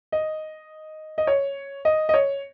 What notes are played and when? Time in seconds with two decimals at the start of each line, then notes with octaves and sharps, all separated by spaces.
0.12 D#5
1.18 D#5
1.27 C#5
1.85 D#5
2.09 D#5
2.14 C#5